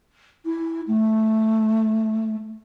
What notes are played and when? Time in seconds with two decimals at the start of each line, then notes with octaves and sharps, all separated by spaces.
0.45 E4
0.87 A3